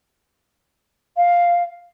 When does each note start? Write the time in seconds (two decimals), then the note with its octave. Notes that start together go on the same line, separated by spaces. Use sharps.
1.17 F5